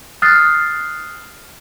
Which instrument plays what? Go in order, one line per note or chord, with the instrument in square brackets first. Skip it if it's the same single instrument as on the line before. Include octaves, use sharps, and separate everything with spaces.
[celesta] D#6 F6 F#6 A6 C7